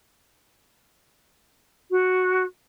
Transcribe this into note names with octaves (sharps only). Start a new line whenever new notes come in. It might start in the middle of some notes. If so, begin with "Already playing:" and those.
F#4